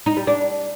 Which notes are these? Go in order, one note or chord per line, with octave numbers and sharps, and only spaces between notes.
D#4
G3
D4